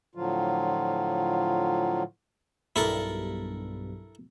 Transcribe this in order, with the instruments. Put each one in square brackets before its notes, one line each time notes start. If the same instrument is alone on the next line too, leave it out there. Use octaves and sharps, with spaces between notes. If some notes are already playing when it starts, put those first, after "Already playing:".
[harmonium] A2 D3 F3 F#3 F4
[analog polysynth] B1 G2 [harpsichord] E4 A4 A#4